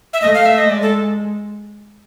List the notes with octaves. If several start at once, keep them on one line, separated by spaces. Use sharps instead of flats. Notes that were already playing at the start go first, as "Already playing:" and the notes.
E5
A3 D#5
F5
E5
D#5
G#3 D5
A4